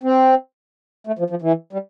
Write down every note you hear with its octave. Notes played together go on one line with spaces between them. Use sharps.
C4
A3
F3
F3
E3
G3